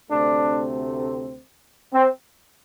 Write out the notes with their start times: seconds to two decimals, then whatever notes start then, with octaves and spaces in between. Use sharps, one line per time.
0.11 D2 C3 A3 C4 D4
1.93 C4